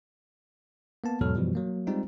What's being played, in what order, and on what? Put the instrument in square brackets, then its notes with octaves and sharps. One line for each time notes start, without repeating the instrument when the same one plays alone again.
[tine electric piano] A#3 B3 A5
E2 G#2 B2 F#3 A4 F6
F#2 B2 E3 F3 G3
F#3 A#3
G3 G#3 C4 D#4 F4